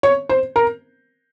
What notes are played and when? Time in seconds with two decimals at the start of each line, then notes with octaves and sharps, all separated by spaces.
0.03 C#5
0.29 C5
0.56 A#4